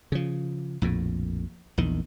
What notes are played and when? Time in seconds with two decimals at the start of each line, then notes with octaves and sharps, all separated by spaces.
0.12 C#3 F3
0.82 A#1 F2 A2
1.78 A#1 E2 D#3